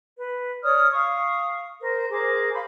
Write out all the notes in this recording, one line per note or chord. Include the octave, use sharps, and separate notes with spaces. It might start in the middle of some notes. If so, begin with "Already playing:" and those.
B4
C#5 D5 D#6 F6
F5 C#6 D#6
A#4 C5
G#4 A#4 C5 D6
C5 F5 B5 C6